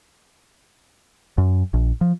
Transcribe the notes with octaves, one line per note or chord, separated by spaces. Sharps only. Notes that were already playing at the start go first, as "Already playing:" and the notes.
F#2
A#1
F3